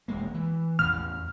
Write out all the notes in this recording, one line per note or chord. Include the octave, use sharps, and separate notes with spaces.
E1 G#3 A#3
E3
A1 E2 F6